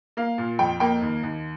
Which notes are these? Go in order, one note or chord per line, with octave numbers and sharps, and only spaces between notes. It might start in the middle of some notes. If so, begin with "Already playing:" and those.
A#3 F5
A#2
F2 G5
A#3 G5
D#2
D#2